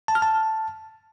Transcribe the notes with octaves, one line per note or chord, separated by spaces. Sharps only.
A5
F6
A5